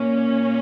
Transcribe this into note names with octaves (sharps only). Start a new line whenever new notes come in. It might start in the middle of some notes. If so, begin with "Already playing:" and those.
Already playing: A#2 A#3 C#4